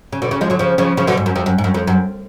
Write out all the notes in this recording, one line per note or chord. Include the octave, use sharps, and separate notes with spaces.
C#3
B2 D3
C#3
F3 G#3
D3 F#3
C#3 F3
C#3 F3
C#3 F3
B2 D3
G#2
F#2
F2
F#2
G#2
F#2
F2
F#2